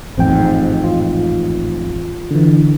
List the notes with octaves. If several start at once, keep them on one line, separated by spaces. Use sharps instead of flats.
A1 F2 G#2 C4 G5
F4
D3 E3